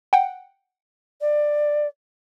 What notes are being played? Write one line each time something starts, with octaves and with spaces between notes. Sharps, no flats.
F#5 G5
D5